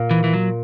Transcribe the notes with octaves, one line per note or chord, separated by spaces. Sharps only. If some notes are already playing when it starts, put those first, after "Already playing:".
Already playing: A#2
E3
E3
F#3